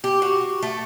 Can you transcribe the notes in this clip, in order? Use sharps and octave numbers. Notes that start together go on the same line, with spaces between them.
G4
F#4
A3